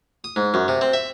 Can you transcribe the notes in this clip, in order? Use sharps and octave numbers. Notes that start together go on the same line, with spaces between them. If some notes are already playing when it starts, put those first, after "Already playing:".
D#6
G#2
F#2
C3
C4
E5